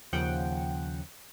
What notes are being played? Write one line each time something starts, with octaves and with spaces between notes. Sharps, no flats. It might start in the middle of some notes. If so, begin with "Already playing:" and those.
D#2 C#3 F3 F#5 G5